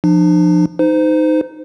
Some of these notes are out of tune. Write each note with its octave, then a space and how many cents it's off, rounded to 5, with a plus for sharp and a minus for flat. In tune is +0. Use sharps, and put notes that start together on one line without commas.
F3 +0 D4 +45
D#4 +0 C5 -35